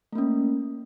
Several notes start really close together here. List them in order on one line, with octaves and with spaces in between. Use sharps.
A3 A#3 C#4